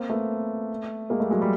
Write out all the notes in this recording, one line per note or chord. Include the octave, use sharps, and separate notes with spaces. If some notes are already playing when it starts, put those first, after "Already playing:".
Already playing: A#3 C4
A3 B3
G#3 A#3
G3 A3
F#3 G#3
G3